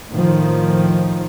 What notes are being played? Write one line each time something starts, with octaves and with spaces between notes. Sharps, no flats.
A2 D#3 F3